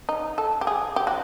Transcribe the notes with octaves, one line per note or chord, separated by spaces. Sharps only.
D#4
A4
G4
G#4
G4
F#4